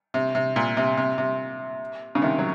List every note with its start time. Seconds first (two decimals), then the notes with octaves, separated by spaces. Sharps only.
0.14 C3
0.35 C3
0.56 A#2
0.77 C3
0.97 C3
1.18 C3
2.15 C#3
2.22 C3 D#3
2.39 F#3